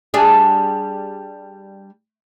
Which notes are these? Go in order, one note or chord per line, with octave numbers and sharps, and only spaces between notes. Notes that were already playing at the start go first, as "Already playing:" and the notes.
G3 D4 G#4